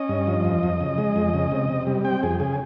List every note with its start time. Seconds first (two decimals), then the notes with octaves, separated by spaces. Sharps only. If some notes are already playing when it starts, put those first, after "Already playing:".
Already playing: C#4 D#5
0.09 G2
0.27 F3
0.45 F2
0.63 F2
0.81 C#3
0.98 G#3
1.16 F2
1.34 C#3
1.52 C3
1.70 C3
1.87 G3
2.05 C4 G5
2.23 F2 G#4
2.40 C#3 G#4